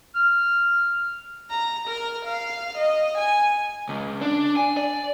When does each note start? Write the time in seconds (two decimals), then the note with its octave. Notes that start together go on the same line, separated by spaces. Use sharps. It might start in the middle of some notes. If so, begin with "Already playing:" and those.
0.15 F6
1.50 A#5
1.88 A#4
2.25 F5
2.78 D#5
3.18 G#5
3.89 C#2
4.22 D4
4.56 G#5
4.77 D5